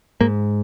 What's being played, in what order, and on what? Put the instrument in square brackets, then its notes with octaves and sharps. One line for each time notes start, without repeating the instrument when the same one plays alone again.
[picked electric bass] G#2 A#3